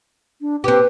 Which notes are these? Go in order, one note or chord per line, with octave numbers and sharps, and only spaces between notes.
D4
C4 G4 B4